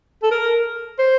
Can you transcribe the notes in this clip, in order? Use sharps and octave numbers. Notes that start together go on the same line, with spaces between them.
A4
A#4
C5